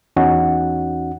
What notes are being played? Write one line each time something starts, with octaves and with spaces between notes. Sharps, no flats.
E2 C#4 D#4 F#4 F#5